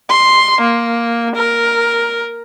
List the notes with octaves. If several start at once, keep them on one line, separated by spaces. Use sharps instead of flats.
C6
A#3
A#4